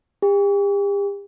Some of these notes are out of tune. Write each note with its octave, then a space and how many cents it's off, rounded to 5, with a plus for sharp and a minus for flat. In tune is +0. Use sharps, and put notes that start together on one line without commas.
G4 +40